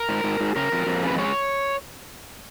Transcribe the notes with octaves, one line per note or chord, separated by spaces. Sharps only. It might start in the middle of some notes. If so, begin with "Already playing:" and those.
Already playing: A#4
G#2
G#2
G#2
C#3 A#4
F2
F2
C#3 B4
G#3 C#5